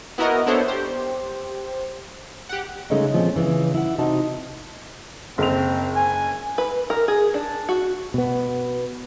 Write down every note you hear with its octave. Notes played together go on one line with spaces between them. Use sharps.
B3 E4 F#4 A#4 D#5 F#5
B3 D4 E4 A4 C5 C#5
G4 C5
G4 F#5
C#3 G#3 A3 C#4 D#4
A#2 F3 G#3 C4 C#4
C#3 E3
E4 F#5
C3 D#4 F#4 A5
F#1 C4 F7
G#5
B4
A#4
G#4
D4
F#4
B2 B3